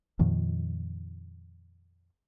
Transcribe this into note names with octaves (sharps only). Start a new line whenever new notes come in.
F2 A#2 D#3 F3